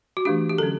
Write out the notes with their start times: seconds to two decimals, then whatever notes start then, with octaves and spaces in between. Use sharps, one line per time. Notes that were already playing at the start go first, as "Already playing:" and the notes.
0.17 F#4
0.25 E3 A3 D4 G4
0.50 G4
0.58 D3 F#3 C#4 A4